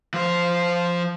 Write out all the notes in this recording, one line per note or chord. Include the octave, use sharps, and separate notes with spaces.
F3 C5